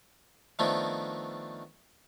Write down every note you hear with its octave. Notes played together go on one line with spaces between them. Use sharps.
D#3 F3 A3 B3 C4 D4